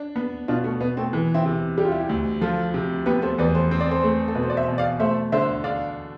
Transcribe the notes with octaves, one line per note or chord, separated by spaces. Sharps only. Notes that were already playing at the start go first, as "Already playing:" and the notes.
Already playing: D4
B3
B2 D4 F4
A3
B2 B3
A3 C4
E3
C4 E4
C3
G3 G4
F4
E4 G4
D2
F3 F4 A4
C3
B3 G4 B4
A4 C5
E2 B4 D5
A4 C5
C4 C5
D5
A4 C5
A3
A4
B2 B4
C5
D5
C5 E5
B2
D5 F5
A3 C5 E5
D3 C5 E5
D4 D5 F5